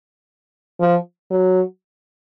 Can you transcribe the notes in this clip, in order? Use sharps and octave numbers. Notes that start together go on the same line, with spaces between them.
F3
F#3